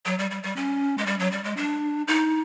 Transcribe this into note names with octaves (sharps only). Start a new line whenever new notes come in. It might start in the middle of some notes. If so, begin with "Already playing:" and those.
F#3
G3
G3
G3
C#4
G#3
G3
F#3
G3
G#3
D4
D#4